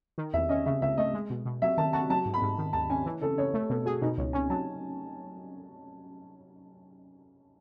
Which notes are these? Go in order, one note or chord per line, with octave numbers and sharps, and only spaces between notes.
D#3
E2 E5
C#4 D#5
C#3 E5
C#2 E5
A3 D#5
G#3
B2
B2
F#3 E5
D#3 A5
F#4 A5
F#3 A5
G#2
B5
G#2
D#3
D#2 A5
C#4 G#5
E3
C#3 A4
C#3 C#5
A3 A4
B2 A4
F#4 G#4
B2 D#4
C#2 C#5
C#4 G#5
F#3 A5